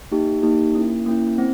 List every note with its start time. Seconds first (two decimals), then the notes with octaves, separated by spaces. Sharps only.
0.11 A#3 D#4 G4
0.43 A#3 D#4 G4
0.75 A#3 C#4 E4
1.06 A#3 C#4 E4
1.38 C4